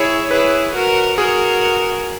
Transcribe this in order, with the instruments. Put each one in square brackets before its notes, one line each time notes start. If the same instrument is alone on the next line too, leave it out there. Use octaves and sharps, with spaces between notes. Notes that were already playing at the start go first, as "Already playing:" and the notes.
Already playing: [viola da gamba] E4 G#4 [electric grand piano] C#5
[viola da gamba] E4 G#4 [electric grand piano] B4
[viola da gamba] F#4 A#4
[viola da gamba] F#4 A#4 [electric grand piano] G#4